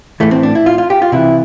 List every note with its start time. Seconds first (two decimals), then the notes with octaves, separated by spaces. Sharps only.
0.20 A2 E3 A3
0.31 C4
0.43 D4
0.55 E4
0.66 F4
0.78 F4
0.90 G4
1.02 F4
1.12 C3 E3 E4